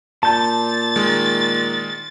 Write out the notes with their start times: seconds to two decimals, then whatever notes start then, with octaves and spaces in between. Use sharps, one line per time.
0.23 A#2 A5 G6 A6
0.96 D#3 G#3